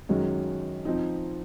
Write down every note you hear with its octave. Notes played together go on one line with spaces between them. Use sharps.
F#2 D#3 G#3 C#4 F#4
F3 C4 D#4